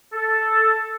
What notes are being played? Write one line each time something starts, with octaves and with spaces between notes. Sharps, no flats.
A4